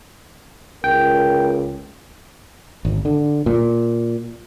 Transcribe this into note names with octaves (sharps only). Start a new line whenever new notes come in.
C#2 A#4 G5
G#1
D3
A#2